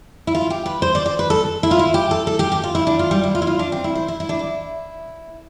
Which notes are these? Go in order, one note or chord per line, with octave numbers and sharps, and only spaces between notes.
E4
F4
G4
B4
C5
D5
C5
B4
A4
E4
F4
E4
G4
A4
A4
G4
G4
F4
E4
D4
F4
G3
E4
F4
E4
F4
D4
C4
E4
C5
E4
E4
D4
E4